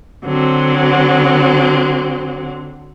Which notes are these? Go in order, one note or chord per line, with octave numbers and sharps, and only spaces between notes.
D3 F#3 C4